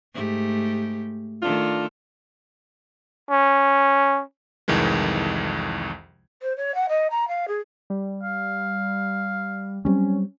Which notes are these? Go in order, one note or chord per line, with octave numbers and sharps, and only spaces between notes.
G#2 A3 G4
D#3 A3 D4 F4 A4
C#4
C2 F2 D#3 E3 G#3
C5
C#5
F#5
D#5
A#5
F5
G#4
G3
F5
F#3 G3 C4 C#4